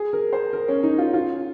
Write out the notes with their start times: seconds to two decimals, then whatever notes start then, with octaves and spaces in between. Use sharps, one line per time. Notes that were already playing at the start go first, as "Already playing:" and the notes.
Already playing: G#4
0.13 A#4
0.33 C5
0.53 A#4
0.68 C#4
0.83 D#4
0.98 F4
1.14 F4